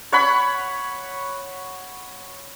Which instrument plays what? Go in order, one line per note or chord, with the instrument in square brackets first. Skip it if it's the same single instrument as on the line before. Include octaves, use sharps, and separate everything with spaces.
[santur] C#5 F#5 B5 C#6